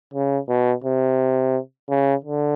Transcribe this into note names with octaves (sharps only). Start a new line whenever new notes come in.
C#3
B2
C3
C#3
D3